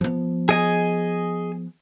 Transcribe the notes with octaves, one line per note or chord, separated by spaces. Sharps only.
F3 B3
G#4 D#5 G#5